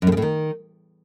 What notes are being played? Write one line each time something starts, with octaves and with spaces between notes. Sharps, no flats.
F#2
A2
C#3
A2
D#3